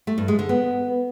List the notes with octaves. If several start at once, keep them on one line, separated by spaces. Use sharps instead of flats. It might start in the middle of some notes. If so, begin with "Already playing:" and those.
A3
G2
G#3
D3
B3